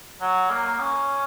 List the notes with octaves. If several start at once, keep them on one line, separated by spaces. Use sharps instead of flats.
F#3
A#3
C#4